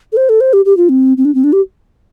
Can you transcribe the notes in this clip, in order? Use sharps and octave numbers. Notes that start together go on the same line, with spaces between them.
A4
C5
A4
C5
G4
G4
F4
C4
C4
D4
C4
D4
G4